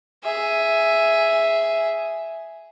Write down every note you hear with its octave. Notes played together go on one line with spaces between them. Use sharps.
G#4 E5